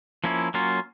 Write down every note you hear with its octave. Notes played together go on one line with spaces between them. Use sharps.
F3 A#3 C#4 E4
F#3 A#3 C#4 F4